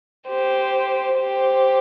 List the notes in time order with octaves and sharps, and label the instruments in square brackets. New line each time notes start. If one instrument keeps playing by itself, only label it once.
[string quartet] G4 C5
G4 C5